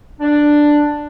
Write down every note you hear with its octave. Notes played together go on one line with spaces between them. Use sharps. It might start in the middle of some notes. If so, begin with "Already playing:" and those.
D4